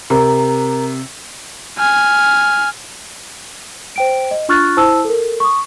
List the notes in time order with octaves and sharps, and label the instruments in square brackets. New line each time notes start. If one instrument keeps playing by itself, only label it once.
[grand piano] C3 [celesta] A#4 A#5
[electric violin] G#5 F6
[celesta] C5 G5 D7
D#5
D4 F4 C#6 F6 F#6 A6
E4 C5 A5 E6
A4 A#4
C#6 D#6